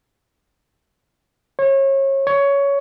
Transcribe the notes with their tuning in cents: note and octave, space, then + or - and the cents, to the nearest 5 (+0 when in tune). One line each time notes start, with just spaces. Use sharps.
C#5 -30
C#5 +15